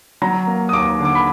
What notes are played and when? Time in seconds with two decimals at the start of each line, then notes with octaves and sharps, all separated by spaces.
0.22 F#3 A#5
0.47 A#3
0.69 D#6
0.73 D#2 D6
0.99 D3
1.05 D6
1.15 B5